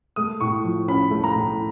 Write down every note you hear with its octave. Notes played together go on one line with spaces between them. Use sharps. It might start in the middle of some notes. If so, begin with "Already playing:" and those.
A3 D#6
A2 C#6
F3
C#4 B5
A3
A#5
A2